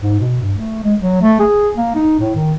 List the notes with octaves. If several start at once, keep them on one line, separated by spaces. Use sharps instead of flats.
G#2
B2
G2
A3
G#3
F#3
A3
G#4
A#3
D#4
A2
D#3